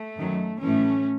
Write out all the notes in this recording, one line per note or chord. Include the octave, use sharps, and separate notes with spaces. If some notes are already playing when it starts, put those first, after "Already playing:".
Already playing: A3
F#2 D#3 F#3
A2 E3 A3 C#4